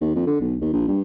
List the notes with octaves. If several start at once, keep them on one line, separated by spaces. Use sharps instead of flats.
D#2
F2
D3
B1
D#2
A#1
G2